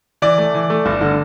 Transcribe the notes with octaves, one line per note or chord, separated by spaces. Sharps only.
E3 D5
A3
E3
A3
G1
D3